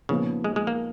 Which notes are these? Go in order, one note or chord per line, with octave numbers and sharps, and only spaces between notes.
A#2 C#3 F3 B3 D#4
G#3
G#3
A#3